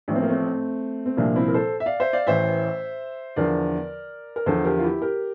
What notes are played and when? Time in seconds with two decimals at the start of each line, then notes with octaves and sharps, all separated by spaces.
0.08 A1 A2 F3 D4
0.15 C4
0.22 A#3
0.30 A3 C4
1.06 C4
1.17 C2 A#2 F3 A#3 D4
1.35 C4 E4
1.48 A#4
1.54 A4 C5
1.80 E5
1.86 D5 F5
2.00 C5 E5
2.13 D5 F5
2.27 A1 A2 E3 C5 E5
3.36 E2 D3 F3 A#4 D5
4.36 A#4
4.46 E2 D3 F3 A4 C5
4.65 G4 A#4
4.79 F4
4.83 E4 G4
5.02 G4 A#4